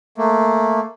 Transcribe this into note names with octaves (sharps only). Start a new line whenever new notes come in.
A3 A#3